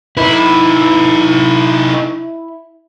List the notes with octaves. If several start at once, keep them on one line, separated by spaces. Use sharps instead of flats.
D#4 E4 B4